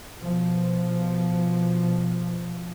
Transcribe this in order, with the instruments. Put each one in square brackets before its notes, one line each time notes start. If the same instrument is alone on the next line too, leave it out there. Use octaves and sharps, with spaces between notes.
[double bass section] B2 F3